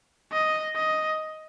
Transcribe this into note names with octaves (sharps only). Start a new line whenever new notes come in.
D#5
D#5